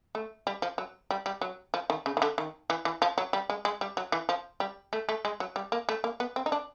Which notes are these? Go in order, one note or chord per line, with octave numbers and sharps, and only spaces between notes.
A3
G3
F3
F#3
G3
G3
F#3
F3
D#3
C#3
D#3
D3
D#3
E3
E3
F3
F#3
G3
G#3
G#3
G3
F#3
E3
F3
G3
A3
A3
G#3
F#3
G3
A#3
A3
A#3
B3
C4
D#4
D4